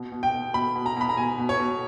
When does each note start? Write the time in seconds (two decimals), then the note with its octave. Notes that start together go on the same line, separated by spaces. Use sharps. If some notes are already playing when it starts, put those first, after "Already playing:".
Already playing: B2
0.12 B2
0.23 G5
0.33 B2
0.54 B2 B5
0.75 B2
0.86 A#5
0.97 B2 B5
1.09 A#5
1.17 B2 G#5
1.38 B2
1.49 C#5
1.60 B2